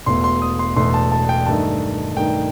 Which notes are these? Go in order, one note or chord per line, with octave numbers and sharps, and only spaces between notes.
E1 E2 B2 A3 C6
C6
D#6
C6
E1 E2 B2 A3 C6
A5
A5
G5
G2 D#3 A3 D#4 A5
G2 D#3 A3 D#4 G5